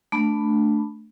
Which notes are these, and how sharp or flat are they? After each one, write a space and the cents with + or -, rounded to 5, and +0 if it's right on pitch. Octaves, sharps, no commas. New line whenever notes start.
A3 +0 D4 +0 B5 +0